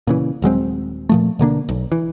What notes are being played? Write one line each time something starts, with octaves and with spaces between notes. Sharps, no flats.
A#2 C#3 E3
D#1 F#3 G#3 C4
A#2 F3 A3
B2 D3 A#3 D4
B1
E3